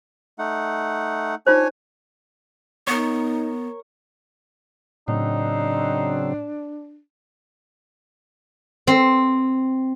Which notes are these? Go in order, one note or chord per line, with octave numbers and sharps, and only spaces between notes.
A3 D#4 F#5
D4 D#4 F4 C5 C#5 G#5
B3 D#4 A#4 C#5
A2 C#3 F#3 C4 D4 D#4
C4